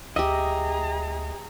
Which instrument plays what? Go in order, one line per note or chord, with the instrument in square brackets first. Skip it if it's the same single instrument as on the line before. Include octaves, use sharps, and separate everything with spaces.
[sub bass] D2 [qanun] G4 F#5 [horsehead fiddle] G#4 A#5 [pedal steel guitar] D#5 E5